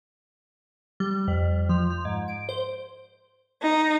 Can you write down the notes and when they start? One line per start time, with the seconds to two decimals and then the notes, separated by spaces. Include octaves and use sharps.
1.00 G3
1.28 F2
1.69 F3
1.90 F3
2.05 G#2
2.28 D7
2.49 C5
3.63 D#4